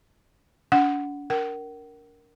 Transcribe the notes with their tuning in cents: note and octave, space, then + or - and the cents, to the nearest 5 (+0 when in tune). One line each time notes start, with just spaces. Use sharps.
D4 -40 F#5 +0
A#4 +0 F#5 +45